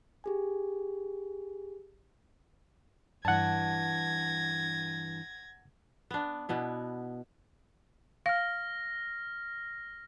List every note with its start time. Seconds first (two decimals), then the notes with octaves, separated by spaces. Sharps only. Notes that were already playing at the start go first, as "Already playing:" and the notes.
0.24 G4 G#4 G#5
3.25 G2 E3 F#5 A5 G#6 A#6
6.11 B3 D4
6.49 B2 B3 E4
8.26 F5 F6 A#6